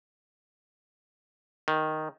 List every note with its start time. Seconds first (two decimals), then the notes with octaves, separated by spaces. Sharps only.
1.68 D#3